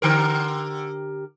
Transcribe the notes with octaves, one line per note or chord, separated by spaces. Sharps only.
D3 G4 A#4